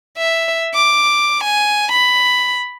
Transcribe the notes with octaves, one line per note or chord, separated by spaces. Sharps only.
E5
D6
G#5
B5